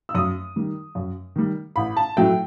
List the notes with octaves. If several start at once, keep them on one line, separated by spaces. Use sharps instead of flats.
E6
F#2 D#6
D#3 G3
F#2
D#3 G3
A1 B5
A5
A2 F#3 A3 G5